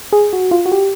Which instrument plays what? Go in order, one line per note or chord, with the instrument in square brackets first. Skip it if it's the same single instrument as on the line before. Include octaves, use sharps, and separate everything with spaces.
[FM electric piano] G#4
F#4
F4
F#4
G4